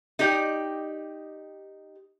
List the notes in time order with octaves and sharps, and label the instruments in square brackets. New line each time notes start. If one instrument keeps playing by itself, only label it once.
[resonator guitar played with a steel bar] D#4 G4 D5